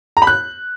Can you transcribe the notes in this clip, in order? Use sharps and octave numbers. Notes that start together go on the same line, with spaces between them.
A#5
B5
F#6